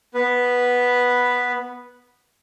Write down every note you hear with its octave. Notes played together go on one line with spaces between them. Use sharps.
B3 B4